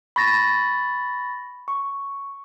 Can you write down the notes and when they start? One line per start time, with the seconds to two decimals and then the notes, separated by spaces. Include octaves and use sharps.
0.16 B5 C#6 A6 A#6
1.68 C#6